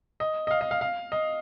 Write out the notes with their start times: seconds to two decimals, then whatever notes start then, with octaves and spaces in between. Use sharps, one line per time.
0.20 D#5
0.47 D#5
0.51 F5
0.61 D#5
0.71 F5
0.81 F5
1.12 D#5